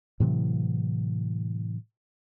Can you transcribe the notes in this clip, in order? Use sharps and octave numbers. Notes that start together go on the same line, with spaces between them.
A2 C3 E3 F#3